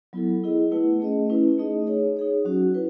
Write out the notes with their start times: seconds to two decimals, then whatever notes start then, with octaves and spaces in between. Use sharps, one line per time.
0.13 F#3 B3 E4 A4
0.41 B3 E4 G#4 D#5
0.71 A3 E4 B4 F#5
1.00 A3 C#4 G#4 D#5
1.30 C#4 E4 B4
1.58 A3 D#4 G#4 D#5
1.87 D#4 G#4 C#5
2.17 D#4 G#4 C#5
2.45 F#3 C#4 F#4
2.74 E4 B4